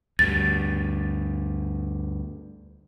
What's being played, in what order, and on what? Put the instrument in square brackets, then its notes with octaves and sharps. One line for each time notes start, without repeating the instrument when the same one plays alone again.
[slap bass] D2 G2 [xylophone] A6